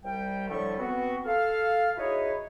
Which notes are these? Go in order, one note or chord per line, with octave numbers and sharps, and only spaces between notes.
C2 G3 G5
A2 D3 F3 G3 E4 C#6
B3 C4 F#4
A4 F5
D#4 E4 F#4 G#4 B4 C#5